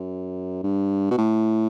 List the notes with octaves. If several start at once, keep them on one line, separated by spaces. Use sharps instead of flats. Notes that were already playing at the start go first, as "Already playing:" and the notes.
Already playing: F#2
G2
B2
A2